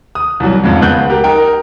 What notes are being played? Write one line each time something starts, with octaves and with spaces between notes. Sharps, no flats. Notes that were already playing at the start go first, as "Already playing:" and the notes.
D#6
C2 E3 F#3
F2 G#2 C#3
C#2 G#3 B3 F#6 G6
G4 A#4
D#4 A#4 G5